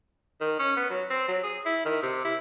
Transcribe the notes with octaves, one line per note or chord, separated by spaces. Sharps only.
D#3
C#4
B3
F#3
C4
F#3
G#4
E4
D#3
C3
E4